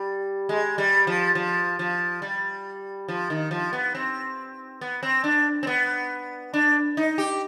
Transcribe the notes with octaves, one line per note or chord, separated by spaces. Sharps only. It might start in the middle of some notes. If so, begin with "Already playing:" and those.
Already playing: G3
G#3
G3
F3
F3
F3
G3
F3
D#3
F3
B3
C4
B3
C4
D4
C4
B3
D4
D#4
G4